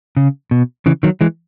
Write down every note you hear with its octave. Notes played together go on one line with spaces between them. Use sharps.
C#3
B2
C#3 E3
D#3 F#3
E3 G#3